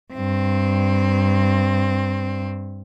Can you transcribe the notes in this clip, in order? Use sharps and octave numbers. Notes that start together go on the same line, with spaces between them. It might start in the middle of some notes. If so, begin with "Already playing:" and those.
G2 C4